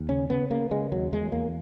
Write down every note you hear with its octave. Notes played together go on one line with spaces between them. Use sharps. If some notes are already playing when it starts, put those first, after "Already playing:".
Already playing: D#2
C#3 C#4
C#3 B3
C#3 A#3
C#3 G#3
D#2 F#3
E2 G#3
E2 A#3